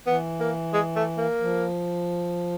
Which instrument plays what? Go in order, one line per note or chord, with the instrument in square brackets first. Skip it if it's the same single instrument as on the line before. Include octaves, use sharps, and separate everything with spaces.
[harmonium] E3 [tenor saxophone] B3
[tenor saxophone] A#3
G#3
A3
A#3
[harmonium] F3